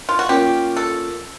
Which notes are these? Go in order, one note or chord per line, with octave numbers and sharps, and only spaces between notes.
F4
F#4
A#3 C#4 F4 G4
A4